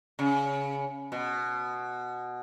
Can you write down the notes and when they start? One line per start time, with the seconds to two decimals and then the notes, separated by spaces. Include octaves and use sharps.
0.19 C#3
1.12 B2